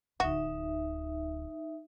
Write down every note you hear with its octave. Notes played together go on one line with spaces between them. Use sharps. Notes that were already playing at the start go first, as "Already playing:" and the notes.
D1 D2 D#4 F#4 E5